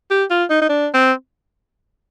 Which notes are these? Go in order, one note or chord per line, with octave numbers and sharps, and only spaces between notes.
G4
F4
D#4
D#4
D4
C4